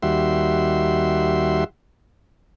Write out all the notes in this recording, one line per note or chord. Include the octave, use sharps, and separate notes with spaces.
D#2 G3 F#4 E5 C6